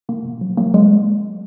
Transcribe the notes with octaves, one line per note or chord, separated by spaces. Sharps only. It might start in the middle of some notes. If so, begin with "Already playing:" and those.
B2 A#3
B2
F#3
F#3 A#3
F#3 G#3